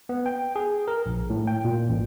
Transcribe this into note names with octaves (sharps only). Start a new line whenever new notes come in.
B3
G5
G#4
A#4
A#1
A2
G5
A#2
A1